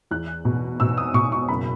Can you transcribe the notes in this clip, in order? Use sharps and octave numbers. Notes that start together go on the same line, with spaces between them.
E2 F#6
B2
B2 E6
D#6
B2 C#6
C#6
F#1 B5